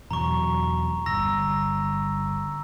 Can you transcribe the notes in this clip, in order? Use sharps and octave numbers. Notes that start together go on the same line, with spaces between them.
E2 B2 F#3 A#5 C#6
G1 A#5 E6 A#6